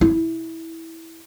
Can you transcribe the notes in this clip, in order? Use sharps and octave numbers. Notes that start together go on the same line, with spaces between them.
E4